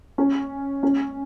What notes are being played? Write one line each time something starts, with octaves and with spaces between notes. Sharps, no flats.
C#4
C#4